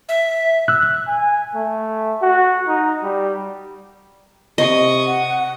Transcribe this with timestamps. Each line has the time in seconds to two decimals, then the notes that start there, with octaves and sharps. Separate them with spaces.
0.09 E5
0.68 E6 F#6
1.07 G#5
1.55 A3
2.22 F#4
2.68 D#4
3.04 G3
4.58 C3 D#5 C#6 D#6
5.06 F#5